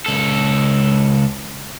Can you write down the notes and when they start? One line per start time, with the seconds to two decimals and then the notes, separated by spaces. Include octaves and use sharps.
0.06 C#2 A4